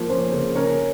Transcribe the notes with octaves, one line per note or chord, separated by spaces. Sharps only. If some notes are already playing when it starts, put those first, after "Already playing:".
Already playing: F3 A#3
C#4 C5
C#3
C#4 A#4 C#5